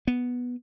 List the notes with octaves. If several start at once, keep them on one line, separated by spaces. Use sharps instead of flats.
B3